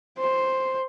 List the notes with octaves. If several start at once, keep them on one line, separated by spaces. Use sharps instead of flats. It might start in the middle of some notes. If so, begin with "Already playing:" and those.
C5